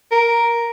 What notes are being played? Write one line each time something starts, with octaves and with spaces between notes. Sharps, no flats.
A#4